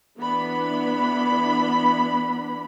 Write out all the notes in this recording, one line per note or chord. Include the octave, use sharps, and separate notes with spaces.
E3 B3 D4 B5